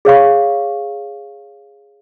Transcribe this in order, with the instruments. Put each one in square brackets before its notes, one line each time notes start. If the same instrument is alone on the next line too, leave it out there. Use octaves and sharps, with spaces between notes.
[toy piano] G#4 C#5 F5 C#6